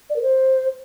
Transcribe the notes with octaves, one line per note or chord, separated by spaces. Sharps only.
D5
A#4
C5